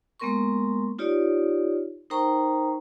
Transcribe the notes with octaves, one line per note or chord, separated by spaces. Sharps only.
G#3 A#3 B3 A#4 C6 C#6
D#4 F4 G4 C#5 D5
D#4 A#4 C5 G5 A#5 C#6